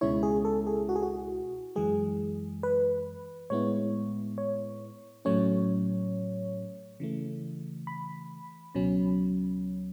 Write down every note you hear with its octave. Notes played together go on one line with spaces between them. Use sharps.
C#2 B2 G#3 C#4 E4 C#5
G#4
A4
G#4
F#4
G#4
F#4
F#2 E3 G#3 G#4
B4
A2 G#3 B3 E4 C#5
C#5
A2 F#3 A3 C#4 C#5
C#3 E3 A3
B5
C#2 B2 F#3 C#4